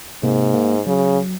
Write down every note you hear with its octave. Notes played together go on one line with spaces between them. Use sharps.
G#2 C3 A#3
A#3
C#3 F#3